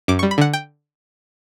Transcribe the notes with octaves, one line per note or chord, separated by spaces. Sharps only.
F#2 D6
G3 C#6
B5
D3 F#5
G5